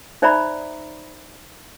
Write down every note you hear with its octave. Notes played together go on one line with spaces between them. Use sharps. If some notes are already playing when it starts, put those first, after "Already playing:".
D#4 C5 D5 E5 A#5 B5